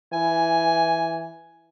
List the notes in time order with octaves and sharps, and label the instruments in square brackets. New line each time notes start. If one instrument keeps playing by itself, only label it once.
[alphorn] E3 [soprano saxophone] G#5